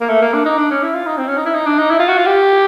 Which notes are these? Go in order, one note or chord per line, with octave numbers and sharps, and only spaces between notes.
A#3
A3
A#3
D4
D#4
D4
C#4
E4
F4
D#4
C4
C#4
D#4
E4
D#4
D4
D#4
E4
F4
F#4
F4
G4